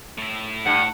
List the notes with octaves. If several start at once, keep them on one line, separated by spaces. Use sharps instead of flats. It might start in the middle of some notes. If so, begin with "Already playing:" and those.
A2 E4
G2 F#5